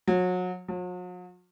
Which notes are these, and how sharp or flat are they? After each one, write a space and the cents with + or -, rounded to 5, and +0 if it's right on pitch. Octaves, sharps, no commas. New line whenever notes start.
F#3 -30
F#3 -45